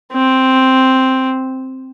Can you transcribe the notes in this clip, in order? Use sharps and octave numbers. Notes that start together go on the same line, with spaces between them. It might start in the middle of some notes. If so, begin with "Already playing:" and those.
C4